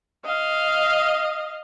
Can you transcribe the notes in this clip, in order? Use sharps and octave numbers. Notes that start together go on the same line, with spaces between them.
D#5 F5